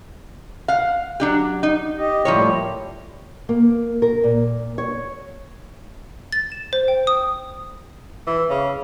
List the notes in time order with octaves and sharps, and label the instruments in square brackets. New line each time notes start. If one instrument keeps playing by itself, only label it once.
[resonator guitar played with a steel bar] F5 F#5
F#3 D4 G4
D#4
[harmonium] G4 D#5
[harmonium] A2 G3 E4 [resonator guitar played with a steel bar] F3 A#3 C#5
[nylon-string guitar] A#3
A#4
A#2
C#5
[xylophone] A6
E7
C5
G5
D#6
[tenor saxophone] E3
C#3